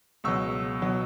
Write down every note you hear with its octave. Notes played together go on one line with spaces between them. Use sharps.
C#2 B2 F#3 C#6 E6
B2 F#3